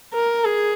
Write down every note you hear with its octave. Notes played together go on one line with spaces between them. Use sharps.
A#4
G#4